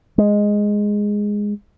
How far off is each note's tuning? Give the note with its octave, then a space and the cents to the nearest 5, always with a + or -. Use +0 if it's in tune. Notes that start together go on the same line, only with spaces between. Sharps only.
G#3 -5